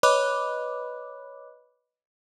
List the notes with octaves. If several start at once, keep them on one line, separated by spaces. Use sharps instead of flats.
B4 C#5 D#5 B5 D6 F#6